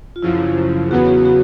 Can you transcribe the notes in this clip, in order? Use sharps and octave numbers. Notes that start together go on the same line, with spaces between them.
F4
F#2 C#3 F3 E4
E2 C#3 F#3 B3 F#4
F#4
F#4